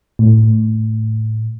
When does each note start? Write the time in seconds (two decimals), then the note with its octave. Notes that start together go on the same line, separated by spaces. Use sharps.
0.19 A2